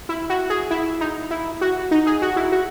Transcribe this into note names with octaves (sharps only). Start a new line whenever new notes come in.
E4
F#4
G#4
E4
D#4
E4
F#4
D#4
G#4
F#4
E4
F#4